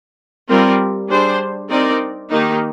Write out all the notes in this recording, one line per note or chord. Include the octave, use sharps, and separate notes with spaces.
G3 C4 F4 A#4
G3 D4 G#4 C5
C4 D#4 A#4 D5
D#3 A#3 D#4 G4